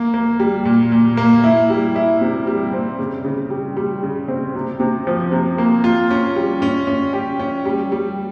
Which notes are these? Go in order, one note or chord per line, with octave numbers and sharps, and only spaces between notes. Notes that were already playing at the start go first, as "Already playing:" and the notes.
Already playing: A#3
A#3
G3
A#2
A#2
A#3
E4
G3
E4
C3
G3
C4
C#3
C#3
G3
G3
C#3
C4
C3
C3
F3
C3
A#3
F4
C#4
G3
C#4
C#4
G4
C#4
G3
G3